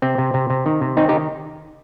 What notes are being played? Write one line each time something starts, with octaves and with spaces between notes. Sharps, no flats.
C3 C4
C3
C3
C3
D#3
C3
D#3 C4 D#4
D#4 G4
D#3